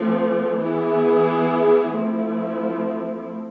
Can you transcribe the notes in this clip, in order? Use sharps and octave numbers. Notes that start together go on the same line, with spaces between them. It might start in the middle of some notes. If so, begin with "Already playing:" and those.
Already playing: F3 A3 C4
E3 B3 E4 G#4
F3 A3 C4 E4